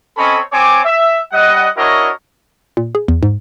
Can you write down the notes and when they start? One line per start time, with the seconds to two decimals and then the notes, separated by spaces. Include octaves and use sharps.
0.17 C4 C#4 A4 C#5 D#5 B5
0.52 C4 C#5 G#5 D6
0.84 E5
1.32 G3 D#5 F#5
1.77 D4 E4 F#4 A#4 C#5 D#5
2.77 A#2
2.95 G#4
3.08 E2
3.23 G#2